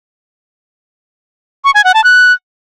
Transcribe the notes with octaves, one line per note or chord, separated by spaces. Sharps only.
C#6
G#5
F#5
A5
F#6